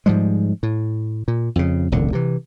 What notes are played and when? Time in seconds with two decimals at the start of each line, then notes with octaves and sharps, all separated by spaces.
0.06 G#2 F3 G3 G#3
0.63 A2
1.28 A#2
1.56 F2 C#3
1.92 E1 C#2 A#2 D3
2.13 C3 E3